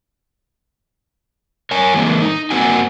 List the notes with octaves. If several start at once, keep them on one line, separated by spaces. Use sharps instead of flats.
A#4 C#5 G#5
E3 G#3 A#3 C4
D#4
G2 A#3 C4 F#4 G#5